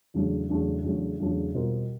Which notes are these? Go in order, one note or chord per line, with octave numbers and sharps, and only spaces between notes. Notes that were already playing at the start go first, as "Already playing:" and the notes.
E2 C#3 F#3 A3 D4
E2 C#3 F#3 A3 D4
E2 C#3 F#3 A3 D4
E2 C#3 F#3 A3 D4
B2 G3 C4 F4 A#4